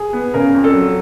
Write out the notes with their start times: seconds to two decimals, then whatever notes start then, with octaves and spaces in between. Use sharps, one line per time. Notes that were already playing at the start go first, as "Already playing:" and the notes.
Already playing: G#4
0.13 B3
0.34 C#3 A#4
0.55 F2
0.64 A4
0.74 F#3